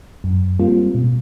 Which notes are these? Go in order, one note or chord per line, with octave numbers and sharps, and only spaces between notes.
F#2
G3 G#3 A#3 C4 F4
B2